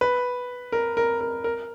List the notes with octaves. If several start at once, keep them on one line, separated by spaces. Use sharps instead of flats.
B4
A#4
A#4
A#4
A#4